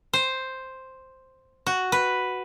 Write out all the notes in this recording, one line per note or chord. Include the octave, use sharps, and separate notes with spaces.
C5
F#4
B4